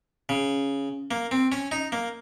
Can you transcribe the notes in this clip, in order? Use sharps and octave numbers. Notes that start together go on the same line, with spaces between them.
C#3
A#3
C4
C#4
D#4
A#3